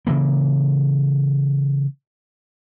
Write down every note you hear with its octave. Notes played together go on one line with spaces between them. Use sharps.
C#3 E3 A#3